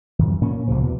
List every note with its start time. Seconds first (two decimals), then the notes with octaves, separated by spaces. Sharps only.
0.19 F#2 E3
0.41 A#2 A#3 C#4
0.68 C2 A#2 C#3 F3
0.80 E2 B2